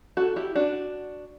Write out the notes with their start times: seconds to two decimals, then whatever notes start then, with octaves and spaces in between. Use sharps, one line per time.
0.17 F#4 A4
0.36 E4 G4
0.55 D4 F#4